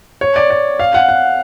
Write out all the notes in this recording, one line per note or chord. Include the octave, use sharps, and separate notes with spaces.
C#5
D5
D5
F5
F#5
F#5